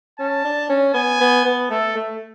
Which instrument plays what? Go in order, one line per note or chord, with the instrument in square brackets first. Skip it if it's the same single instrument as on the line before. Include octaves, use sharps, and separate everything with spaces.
[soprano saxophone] C#4 [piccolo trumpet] A5
[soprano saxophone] D4
C#4
[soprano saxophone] B3 [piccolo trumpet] G#5
[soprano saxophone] B3
B3
[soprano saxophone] A3 [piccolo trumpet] A4
[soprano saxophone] A3